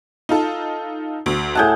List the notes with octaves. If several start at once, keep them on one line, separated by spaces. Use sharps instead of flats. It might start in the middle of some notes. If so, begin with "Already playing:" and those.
D#4 F4 A4
D2
A2 G#4 F#5 A5 G6